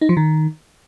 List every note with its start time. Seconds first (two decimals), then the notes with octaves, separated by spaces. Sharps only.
0.01 D#4
0.09 F3
0.17 D#3